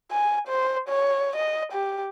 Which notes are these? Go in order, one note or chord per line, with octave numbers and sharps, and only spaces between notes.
G#5
C5
C#5
D#5
G4